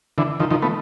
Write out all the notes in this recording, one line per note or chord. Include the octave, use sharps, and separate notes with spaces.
D3 E3
D#3 F3
D#3 F3
A3 B3